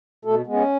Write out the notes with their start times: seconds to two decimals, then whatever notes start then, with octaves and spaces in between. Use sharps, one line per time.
0.25 B2 A3 A4
0.46 G#3 B3
0.53 C#4